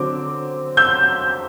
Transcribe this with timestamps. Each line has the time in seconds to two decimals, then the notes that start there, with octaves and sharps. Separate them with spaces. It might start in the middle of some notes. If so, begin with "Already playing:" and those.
Already playing: D3 F#3 C4 D6
0.77 E6 G6